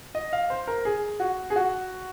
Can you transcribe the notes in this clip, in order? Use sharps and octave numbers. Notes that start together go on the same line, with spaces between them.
D#5
F5
C5
A#4
G#4
F#4
G#4
F#4